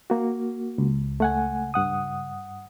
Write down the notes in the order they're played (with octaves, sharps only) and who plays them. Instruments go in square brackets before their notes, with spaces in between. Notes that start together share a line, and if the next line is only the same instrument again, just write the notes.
[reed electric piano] A#3 F#4
[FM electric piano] C#2
[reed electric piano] A3 F#5 G#5
G2 F#5 D#6